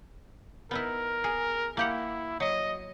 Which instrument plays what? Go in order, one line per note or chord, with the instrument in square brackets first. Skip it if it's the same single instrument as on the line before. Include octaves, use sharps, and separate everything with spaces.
[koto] B3 D#4 E4 [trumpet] A#4
[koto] G#4
[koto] A#3 G4 F#5 [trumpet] E4
[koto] F#3 [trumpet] D#5